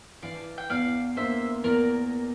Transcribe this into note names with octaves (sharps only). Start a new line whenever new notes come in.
E3 D5 F5
G5
E2 D5 F5
A#3 C5 E5
E2 A#4 D5